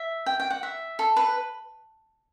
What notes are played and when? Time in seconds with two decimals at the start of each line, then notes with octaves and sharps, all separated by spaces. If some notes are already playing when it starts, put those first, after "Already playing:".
Already playing: E5
0.26 G5
0.40 G5
0.50 F#5
0.63 E5
0.99 A4
1.16 B4